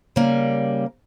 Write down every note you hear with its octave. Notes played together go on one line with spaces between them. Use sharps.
C#3 G3 A#3